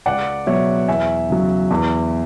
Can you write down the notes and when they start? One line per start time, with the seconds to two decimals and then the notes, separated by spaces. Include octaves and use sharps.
0.06 C#2 D5 F#5
0.46 B2 F#3 C#5 E5
0.88 E2 E5 G#5
1.30 C#3 F#3
1.71 E2